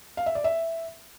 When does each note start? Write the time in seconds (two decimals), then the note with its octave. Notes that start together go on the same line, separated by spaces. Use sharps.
0.17 F5
0.26 E5
0.35 D5
0.44 E5